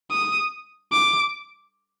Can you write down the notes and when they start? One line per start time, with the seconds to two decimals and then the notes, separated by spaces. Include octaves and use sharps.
0.11 D#6
0.92 D6